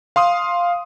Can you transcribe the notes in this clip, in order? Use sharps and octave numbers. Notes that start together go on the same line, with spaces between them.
F5 C6 D#6